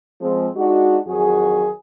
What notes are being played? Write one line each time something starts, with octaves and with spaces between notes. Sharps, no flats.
F3 G#3 C4
G#3 D4 D#4 F#4
F2 D#3 F#3 F#4 G#4